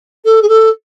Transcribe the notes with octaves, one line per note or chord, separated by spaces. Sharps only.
A4
G#4
A4